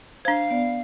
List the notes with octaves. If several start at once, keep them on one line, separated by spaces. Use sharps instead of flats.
D4 C5 F5
B3 D5